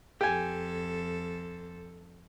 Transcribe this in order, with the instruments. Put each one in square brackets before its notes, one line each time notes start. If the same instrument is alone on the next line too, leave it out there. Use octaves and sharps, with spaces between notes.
[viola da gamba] F2 A4 [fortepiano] G4 G#5